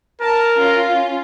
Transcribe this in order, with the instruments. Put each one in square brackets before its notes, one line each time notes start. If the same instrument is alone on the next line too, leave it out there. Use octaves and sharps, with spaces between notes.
[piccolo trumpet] A#4 [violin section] A5
[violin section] C#4 F4